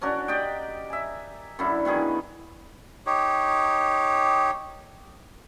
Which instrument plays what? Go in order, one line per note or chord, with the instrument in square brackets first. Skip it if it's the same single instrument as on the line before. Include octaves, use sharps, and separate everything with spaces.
[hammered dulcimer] C#4 D4 F#4 A#4
G4 D5 D#5 G5
E5 G#5
F#2 D3 E4
B2 D#3 E3 G#4
[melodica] D#4 G4 C#5